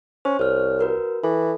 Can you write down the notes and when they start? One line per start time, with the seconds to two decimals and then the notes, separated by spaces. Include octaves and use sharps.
0.25 C#4 C5
0.39 C2 C#5 F6
0.79 F#4 A#4 B4
1.24 E3 A4